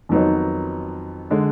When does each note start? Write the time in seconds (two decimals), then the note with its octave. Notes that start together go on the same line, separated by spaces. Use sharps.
0.09 F2 D#3 F#3 B3 D#4
1.31 D3 G#3